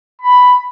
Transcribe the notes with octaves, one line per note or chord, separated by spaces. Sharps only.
B5